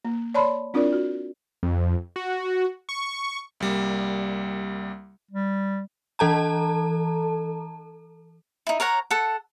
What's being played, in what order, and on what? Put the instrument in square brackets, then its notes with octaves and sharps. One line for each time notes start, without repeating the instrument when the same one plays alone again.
[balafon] A#3
C#5 D5 A5 B5 C6
C4 D4 E4 F4 A#4 D5
F#4
[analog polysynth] F2
F#4
C#6
[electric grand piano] C2 G3 A#3
[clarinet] G3
[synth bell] E3 A4 A5 A#5
[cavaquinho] D#4 E4
A#4 C#5 F#5 A#5
A4 F#5